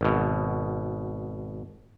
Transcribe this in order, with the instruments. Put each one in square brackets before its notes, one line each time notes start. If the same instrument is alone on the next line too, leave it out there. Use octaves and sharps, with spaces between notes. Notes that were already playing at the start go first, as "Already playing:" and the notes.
[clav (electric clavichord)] G#1 B2